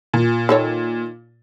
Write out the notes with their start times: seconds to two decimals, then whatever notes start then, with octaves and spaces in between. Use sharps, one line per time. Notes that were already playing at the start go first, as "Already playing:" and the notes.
0.14 A#2
0.49 D#3 A4 C#5